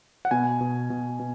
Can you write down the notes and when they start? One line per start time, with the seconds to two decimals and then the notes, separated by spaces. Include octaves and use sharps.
0.25 F#5
0.31 B2 G#5
0.61 B2
0.90 B2
1.20 B2